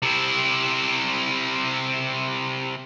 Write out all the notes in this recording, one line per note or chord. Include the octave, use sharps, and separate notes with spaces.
C3 E4